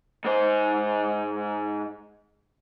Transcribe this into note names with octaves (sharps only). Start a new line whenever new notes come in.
G#2 C5